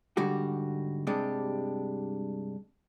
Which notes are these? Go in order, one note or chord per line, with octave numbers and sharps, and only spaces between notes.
G#2 D3 G3 F#4 G4
G2 C3 G3 G#3 D4 G4